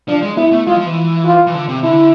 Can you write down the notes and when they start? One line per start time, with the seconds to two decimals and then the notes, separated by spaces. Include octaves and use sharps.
0.09 F3 D4
0.22 G#3
0.37 B3 E4
0.52 A3
0.67 G#3 F4
0.76 F3
0.86 E3
1.25 F4
1.47 E3
1.54 D3
1.69 C3
1.83 D3 E4